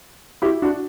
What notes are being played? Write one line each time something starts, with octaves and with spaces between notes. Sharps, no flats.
E4 G4
D4 F#4